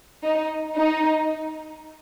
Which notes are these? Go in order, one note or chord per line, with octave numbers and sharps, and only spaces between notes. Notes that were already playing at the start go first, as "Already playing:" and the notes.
D#4
D#4